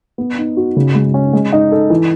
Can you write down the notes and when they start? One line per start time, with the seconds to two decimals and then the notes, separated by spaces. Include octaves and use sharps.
0.18 B3
0.38 D#4
0.57 F#4
0.77 C#3
0.95 G#3
1.14 C#4
1.33 G#3
1.52 D#4
1.72 A4
1.90 E3